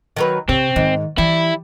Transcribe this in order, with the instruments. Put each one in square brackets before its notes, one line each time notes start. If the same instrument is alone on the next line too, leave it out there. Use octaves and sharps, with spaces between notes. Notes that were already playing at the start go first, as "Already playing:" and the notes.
[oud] D#3 F#3 B4
[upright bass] C3 [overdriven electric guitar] C4 [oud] C#5
[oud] G#2 [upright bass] D#3
[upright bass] E3 [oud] G3 [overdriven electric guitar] E4